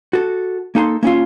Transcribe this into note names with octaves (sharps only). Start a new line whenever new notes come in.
F#4 A4
A#3 D#4 A4 A5 C6
A#3 C#4 E4 F4